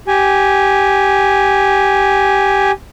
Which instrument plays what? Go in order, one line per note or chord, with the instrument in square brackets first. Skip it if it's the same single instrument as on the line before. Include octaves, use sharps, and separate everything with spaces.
[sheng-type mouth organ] G4 G#5